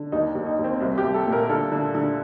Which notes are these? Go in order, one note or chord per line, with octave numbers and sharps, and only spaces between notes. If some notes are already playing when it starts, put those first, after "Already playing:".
Already playing: D3
D#2 D#4
D#2
D#4
D#2
C4
C2 C4
G4
C2
A4
A#2
A#4
D3 A4
D3
D3